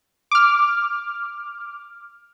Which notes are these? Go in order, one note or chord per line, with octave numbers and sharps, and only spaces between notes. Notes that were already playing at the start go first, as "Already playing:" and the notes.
D6 F6